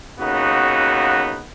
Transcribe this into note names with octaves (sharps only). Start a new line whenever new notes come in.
D#2 C#3 B3 D#4 F#4